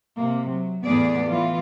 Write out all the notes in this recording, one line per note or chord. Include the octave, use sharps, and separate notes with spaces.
C3 A#3
F#3
E2 A2 B3 G#4 D5
E3 F4